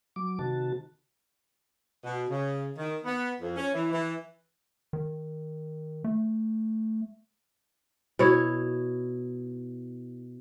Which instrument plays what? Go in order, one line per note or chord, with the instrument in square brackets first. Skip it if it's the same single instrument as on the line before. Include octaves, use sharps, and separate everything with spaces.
[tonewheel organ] F#3 D6
C3 D#3 F#4 A5
[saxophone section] B2
C#3
D#3
B3
F2
C#4
E3
E3
[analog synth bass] D#3
A3
[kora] B2 E4 C#5